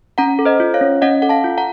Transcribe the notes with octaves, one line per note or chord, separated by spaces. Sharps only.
C#4 F#5 A#5
A4
C5 D#5
F4
C#5 F5
C#4
C#4 D#5 F#5
A4 F#5
F5 A5
F4
F#5 A#5